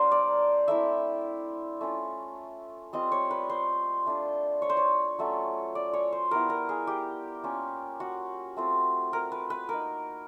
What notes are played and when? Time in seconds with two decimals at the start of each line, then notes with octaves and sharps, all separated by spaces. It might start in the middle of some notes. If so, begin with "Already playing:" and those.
Already playing: F#3 A#3 D4 A#4 C5
0.11 D5
0.68 A3 C4 E4 E5
1.81 A3 C#4 F4
2.93 G3 C4 F4 D#5
3.12 C#5
3.31 B4
3.50 C5
4.06 A3 D4 F4
4.62 C#5
4.70 C5
4.77 C#5
5.18 F#3 A3 C#4 F4
5.75 D5
5.93 C#5
6.12 C5
6.31 G3 B3 E4 A#4
6.50 A#4
6.69 G#4
6.87 G4
7.44 A#3 C#4 F4
8.00 F#4
8.57 A3 C4 F4
9.13 A#4
9.32 B4
9.50 B4
9.69 A#3 D#4 A#4